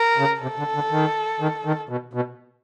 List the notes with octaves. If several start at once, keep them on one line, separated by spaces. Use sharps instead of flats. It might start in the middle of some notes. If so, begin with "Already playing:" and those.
Already playing: A#4
C#3
C3 A4
D3
D3
D#3
D#3
D#3
B2
B2